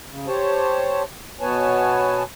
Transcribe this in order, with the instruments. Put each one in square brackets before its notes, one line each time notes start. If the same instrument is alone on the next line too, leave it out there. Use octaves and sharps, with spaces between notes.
[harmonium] C#3
G4 C5 C#5 A5
B2 B3 B4 C#5 G#5 A5